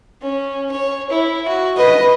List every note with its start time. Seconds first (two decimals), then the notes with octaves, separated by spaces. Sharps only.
0.22 C#4
0.72 C#5
1.10 E4
1.48 F#4
1.77 B4 D#5